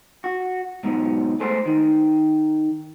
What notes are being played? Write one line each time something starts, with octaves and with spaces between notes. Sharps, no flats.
F#4
G#2 B2 F#3
A3 G#4 C5
D#3